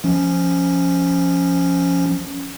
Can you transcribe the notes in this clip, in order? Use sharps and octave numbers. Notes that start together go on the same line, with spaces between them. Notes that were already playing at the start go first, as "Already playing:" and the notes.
F3 C#4